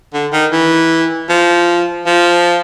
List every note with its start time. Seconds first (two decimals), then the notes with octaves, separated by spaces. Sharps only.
0.14 D3
0.33 D#3
0.52 E3
1.29 F3
2.06 F3